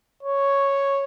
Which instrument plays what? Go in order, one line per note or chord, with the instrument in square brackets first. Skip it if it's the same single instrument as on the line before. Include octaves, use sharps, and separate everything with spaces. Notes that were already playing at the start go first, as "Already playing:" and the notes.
[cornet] C#5